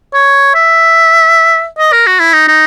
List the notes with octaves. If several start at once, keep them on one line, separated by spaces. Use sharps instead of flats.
C#5
E5
D#5
A#4
F#4
E4
D#4
D#4